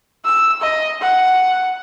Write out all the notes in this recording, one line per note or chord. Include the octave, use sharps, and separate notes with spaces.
E6
D#5
F#5